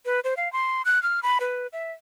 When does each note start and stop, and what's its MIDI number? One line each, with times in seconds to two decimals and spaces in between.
0.05 0.20 71
0.24 0.34 72
0.37 0.51 77
0.53 0.82 84
0.85 1.02 90
1.03 1.20 89
1.23 1.38 83
1.40 1.67 71
1.73 1.92 76